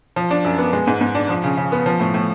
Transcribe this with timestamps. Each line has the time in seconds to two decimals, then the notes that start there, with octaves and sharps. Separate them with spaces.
0.16 F3
0.31 D4
0.45 F#2
0.58 B3
0.73 G#3
0.87 G#2
1.01 G#2
1.15 D4
1.29 F3
1.44 C#3
1.58 C#3
1.72 B3
1.86 F3
2.00 A2
2.14 A2